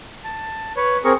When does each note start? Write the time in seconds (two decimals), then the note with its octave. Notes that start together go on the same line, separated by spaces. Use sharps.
0.24 A5
0.76 B4 C#5
1.04 C4 G#4 A#4 C#6